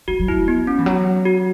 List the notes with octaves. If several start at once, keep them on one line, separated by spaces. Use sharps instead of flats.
A3 F#4
F#3
A3 E4
B3
C#4
E3
F#3
F#4